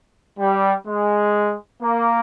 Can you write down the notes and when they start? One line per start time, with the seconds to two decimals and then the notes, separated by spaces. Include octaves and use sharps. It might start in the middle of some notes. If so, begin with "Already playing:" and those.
0.39 G3
0.87 G#3
1.83 A#3